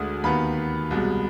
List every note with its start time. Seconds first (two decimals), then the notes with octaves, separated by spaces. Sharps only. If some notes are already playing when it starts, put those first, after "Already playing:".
Already playing: D2 D3 G#3 D#6
0.24 D#2 D#3 B3 B5
0.91 C2 B2 G#3